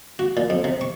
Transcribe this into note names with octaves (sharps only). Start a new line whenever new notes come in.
F#4
A#2
F2
C3
C#6